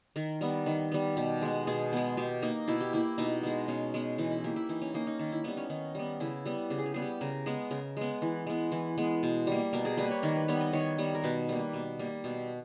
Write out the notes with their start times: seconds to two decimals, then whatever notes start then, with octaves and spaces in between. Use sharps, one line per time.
0.16 D#3 A#4
0.41 G3 B3 A#4
0.66 D#3
0.92 G3 B3
1.17 B2 G4
1.42 G#3 B3
1.67 B2 G#4
1.93 G#3 B3
2.17 B2 G4
2.42 A#3 D#4
2.68 B2 E4
2.81 G4
2.93 A#3 E4
3.18 B2 D#4
3.43 G#3 B3
3.68 B2 C#4
3.94 G#3 B3
4.18 E3 D#4
4.31 E4
4.44 A#3 G4
4.56 E4
4.69 E3 D#4
4.82 C#4
4.94 A#3 D#4
5.07 D#4
5.19 D#3 D#4
5.32 E4
5.44 G3 B3 D#4
5.57 C#4
5.70 D#3 D#4
5.95 G3 B3
6.20 C#3 E4
6.45 G3 B3
6.70 C#3 G4
6.79 G#4
6.86 G4
6.94 G3 B3 G#4
7.02 G4
7.21 C#3 A#4
7.46 G#3 B3
7.71 C#3 A#4
7.97 G#3 B3
8.22 E3
8.47 G#3 B3
8.72 E3
8.98 G#3 B3
9.23 B2
9.47 G3 A#3
9.73 B2 A#4
9.85 G#4
9.97 G3 A#3 B4
10.11 C#5
10.23 D#3 A#4
10.36 B4
10.48 G3 B3 C#5
10.61 D#5
10.73 D#3 C#5
10.98 G3 B3
11.15 A#4
11.24 B2 B4
11.49 G3 A#3 B4
11.73 B2
11.99 G3 A#3
12.24 B2